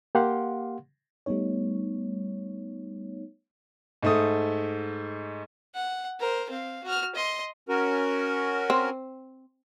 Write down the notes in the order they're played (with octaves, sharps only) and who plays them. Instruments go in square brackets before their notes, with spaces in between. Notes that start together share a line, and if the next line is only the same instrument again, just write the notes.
[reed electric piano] A#3 G4 F5 F#5 C6
[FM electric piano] G3 A3 B3 D#4 C#5
[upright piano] G#2 A3 D#6
[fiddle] F#5
A#4 C5
C4 F5
F#4 F6
D#5 C6
[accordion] C#4 F#4 A#4
[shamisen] C4